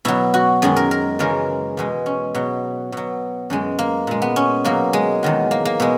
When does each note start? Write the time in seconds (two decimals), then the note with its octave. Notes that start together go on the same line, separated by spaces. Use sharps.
0.05 B2 F#3 E4
0.34 F#4
0.62 F#2 D#3 G#3 G#4
0.76 A#4
0.91 A#4
1.19 F#2 C#3 E3 G#3 A#4
1.77 E2 B2 G#3
2.06 C#4
2.35 B2 F#3
2.92 B2 F#3
3.50 F#2 E3 G#3
3.79 A#3
4.07 A#2 G#3
4.22 B3
4.36 C#4
4.65 B2 F#3 A#3
4.93 G#3
5.23 E2 D#3 F#3
5.51 A#3
5.65 A#3
5.80 B2 G#3